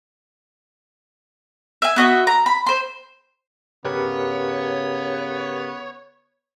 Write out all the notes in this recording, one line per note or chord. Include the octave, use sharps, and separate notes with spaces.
E5 G#5
B3 F#4 D#5 E5
A#5
B5
C5 C6
C#3 B3 G4 A#4 B4 C#5